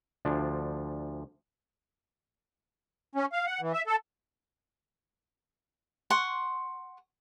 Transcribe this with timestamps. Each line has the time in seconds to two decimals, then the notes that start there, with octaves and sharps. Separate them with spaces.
0.25 D2 F3 D4
3.15 C#4
3.32 F5
3.46 F#5
3.61 E3
3.73 E5
3.87 A4
6.10 F#5 C6 C#6